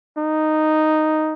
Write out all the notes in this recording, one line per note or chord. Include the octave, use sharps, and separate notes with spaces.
D#4